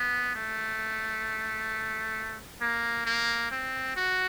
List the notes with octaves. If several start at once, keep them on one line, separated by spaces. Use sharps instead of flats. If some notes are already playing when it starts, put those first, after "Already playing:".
Already playing: B3
A3
A#3
A#3
C4
F#4